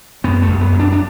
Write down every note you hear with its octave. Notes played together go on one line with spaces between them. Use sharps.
F#2 B3
A3
F#2
B3
F#2
D4
D4